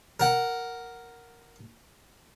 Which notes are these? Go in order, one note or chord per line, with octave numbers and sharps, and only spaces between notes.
A#4 F#5